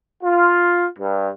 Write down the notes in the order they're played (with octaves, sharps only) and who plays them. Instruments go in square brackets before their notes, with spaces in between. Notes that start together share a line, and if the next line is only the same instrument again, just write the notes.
[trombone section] F4
G2